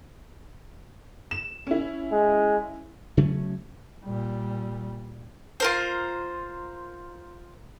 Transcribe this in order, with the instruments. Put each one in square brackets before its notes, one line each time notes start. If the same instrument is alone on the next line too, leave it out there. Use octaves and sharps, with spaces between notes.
[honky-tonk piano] E7
C#4 E4
[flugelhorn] G#3
[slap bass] C#3 F#3 A3 C#4
[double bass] A#2 G3
[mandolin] F4 A#4 C5